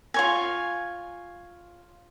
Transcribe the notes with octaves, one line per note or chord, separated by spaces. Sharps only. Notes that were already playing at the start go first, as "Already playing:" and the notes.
F4 C#5 G#5